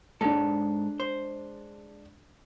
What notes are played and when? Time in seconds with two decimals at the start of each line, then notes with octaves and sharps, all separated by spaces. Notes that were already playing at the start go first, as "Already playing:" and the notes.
0.21 G#2 G#3 D4 A4
1.00 C5